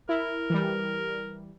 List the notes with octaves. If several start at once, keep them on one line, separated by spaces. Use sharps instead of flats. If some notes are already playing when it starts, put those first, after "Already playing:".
E4 A#4
E3 G3